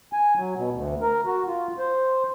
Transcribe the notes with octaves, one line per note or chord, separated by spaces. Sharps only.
G#5
F#3
B2
D2
A#4
F#4
F4
C5